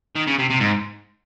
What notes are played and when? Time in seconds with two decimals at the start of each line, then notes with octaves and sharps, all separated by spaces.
0.16 D#3
0.27 C#3
0.39 C3
0.50 C3
0.60 G#2